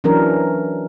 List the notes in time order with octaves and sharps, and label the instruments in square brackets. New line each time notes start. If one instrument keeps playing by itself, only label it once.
[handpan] E3 F#3 C#4 D4 A#4